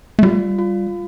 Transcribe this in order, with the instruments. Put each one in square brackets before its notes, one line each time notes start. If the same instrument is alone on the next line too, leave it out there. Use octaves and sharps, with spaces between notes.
[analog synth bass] A3
[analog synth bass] G3 [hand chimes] F4
[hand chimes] F4